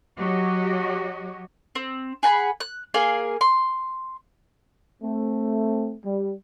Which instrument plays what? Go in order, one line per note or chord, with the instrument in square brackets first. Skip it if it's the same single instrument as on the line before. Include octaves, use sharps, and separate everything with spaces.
[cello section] F#3 F#4 G4 C#5 D#5
[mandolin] C4
G#4 F#5 A#5 B5
F#6
A#3 G#4 F5 G#5
C6
[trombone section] A3 C4
G3